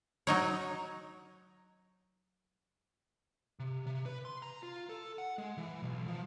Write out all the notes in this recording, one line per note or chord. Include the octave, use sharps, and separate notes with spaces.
F#3 D#4 C#5
C3
C3
B4
C6
A#5
F4
A4
F#5
G#3
E3
B1
F3